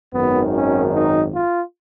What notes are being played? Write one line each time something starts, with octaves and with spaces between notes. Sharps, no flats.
G#1 F#2 D#3 B3
C#4
D#4
F4